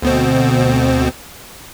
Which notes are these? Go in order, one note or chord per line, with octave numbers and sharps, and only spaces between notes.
D2 B2 C4